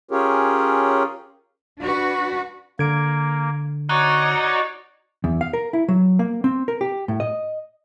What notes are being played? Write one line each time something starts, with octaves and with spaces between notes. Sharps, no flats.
C#4 F4 G4 G#4 A#4 C#5
D4 F#4 B4
D3 A#3 G#6 D7
D#4 F#4 C#5 D5 F#6
E2
F5
A#4
E4
F#3
A#3
C4
A#4
G4
A2
D#5